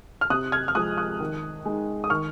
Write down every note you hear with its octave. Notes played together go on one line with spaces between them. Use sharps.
F6
C3 D#6 F#6
F6 G#6
F6
F3 G#3 D#6 F#6
D#6 F#6
D#3
G#3 D#4
D#6
D#3 C#6 F6